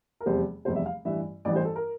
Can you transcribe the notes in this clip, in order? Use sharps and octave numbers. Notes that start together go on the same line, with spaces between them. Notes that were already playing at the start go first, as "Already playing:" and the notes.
A#4
F1 E2 C3 G3 C5
F1 E2 C3 G3 C5
E5
F5
A1 G2 E3 E5
A1 G2 E3 D5
C5
A4
A#4